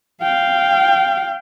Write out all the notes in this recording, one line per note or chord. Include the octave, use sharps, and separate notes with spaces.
F5 G5